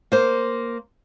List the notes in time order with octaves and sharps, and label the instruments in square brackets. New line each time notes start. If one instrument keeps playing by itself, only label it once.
[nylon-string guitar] A#3 C5